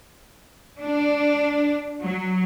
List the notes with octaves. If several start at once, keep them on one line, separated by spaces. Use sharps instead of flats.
D4
F#3